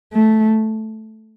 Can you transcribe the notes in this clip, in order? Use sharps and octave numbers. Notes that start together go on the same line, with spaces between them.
A3